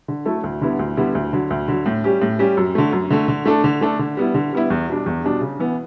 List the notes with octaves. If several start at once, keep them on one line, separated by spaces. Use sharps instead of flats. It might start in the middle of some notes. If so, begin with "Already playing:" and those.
D3
F#3 A3 E4 A4
D2
D3 G3 B3 E4
D2
D3 G3 B3 E4
D2
D3 F#3
D2
D3 F#3
A2
G3 C#4 G4
A2
G3 C#4 G4
F#2
D3 A3
F#2
D3 A3
D3
A3 D4 A4
D3
A3 D4 A4
D3
G3 B3 E4
D3
G3 B3 E4
E2
B2 G3 D4
E2
B2 G3 D4
C#3
E3 B3